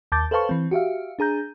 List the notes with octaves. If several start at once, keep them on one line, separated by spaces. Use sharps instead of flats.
D#2 A5 D6 G6 A6
A4 B4 C5 F5 A5 C#6
E3 C4
F#4 G4 E5 F5
D4 G#4 A#5 G6